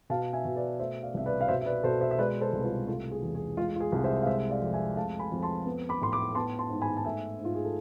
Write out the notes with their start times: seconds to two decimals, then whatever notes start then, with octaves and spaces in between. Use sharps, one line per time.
0.10 B2 F5 A5
0.33 E5 G#5
0.45 B2
0.56 B4 D5
0.80 A3 C5 E5
1.02 D5 F5
1.14 C2 E5
1.26 B4 D5
1.41 F5
1.48 B2 C5 E5
1.61 E5
1.66 B4 D5
1.83 B2 A4 C5
2.01 C5 E5
2.11 E5
2.19 G#3 B4 D5
2.41 A4 C5
2.53 C2
2.61 B4
2.65 F4 A4
2.88 A3 F4
3.11 G#4
3.22 E2
3.35 G#4
3.57 G#3 F4
3.76 F4
3.80 G#4
3.92 C2
4.04 C5 E5
4.22 F5
4.26 G#3 C5 E5
4.50 D5 F5
4.62 F2
4.73 E5 G#5
4.96 A3 F5 A5
5.19 G#5 B5
5.32 F2
5.43 A5 C6
5.66 B3
5.89 B5 D6
6.01 A2 C6
6.12 B5 D6
6.35 B3 A5 C6
6.59 A5 C6
6.70 G#2
6.82 G#5 B5
6.97 A5
7.05 A3 E5 G#5
7.39 G#2
7.45 F4
7.55 G#4
7.64 A4